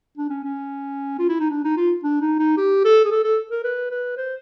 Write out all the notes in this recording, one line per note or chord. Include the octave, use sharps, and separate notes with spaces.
D4
C#4
C#4
F4
E4
D#4
D4
D#4
F4
D4
D#4
D#4
G4
A4
G#4
A4
A4
A#4
B4
B4
C5